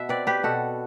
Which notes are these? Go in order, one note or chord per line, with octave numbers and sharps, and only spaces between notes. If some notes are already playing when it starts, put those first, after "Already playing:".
Already playing: B2 E5 F#5
C4 B4 D5
G4 B4
B2 F#4 A4